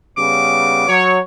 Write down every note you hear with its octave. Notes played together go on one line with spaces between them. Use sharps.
C#3 G3 B3 D6
F#3 C#5